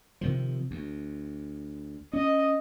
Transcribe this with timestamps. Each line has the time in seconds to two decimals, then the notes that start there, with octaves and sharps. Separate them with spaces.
0.21 C3 D#3 F3
0.71 D2
2.13 C#4 D#5